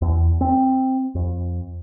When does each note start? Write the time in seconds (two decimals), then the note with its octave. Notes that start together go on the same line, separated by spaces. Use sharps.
0.02 E2
0.41 C4
1.15 F2